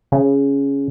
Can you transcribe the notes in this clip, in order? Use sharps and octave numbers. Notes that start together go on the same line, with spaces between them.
C#3